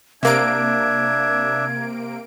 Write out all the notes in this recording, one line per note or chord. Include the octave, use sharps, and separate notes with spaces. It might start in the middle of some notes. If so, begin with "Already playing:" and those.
C3 A#3 D4 E5 G#6 D7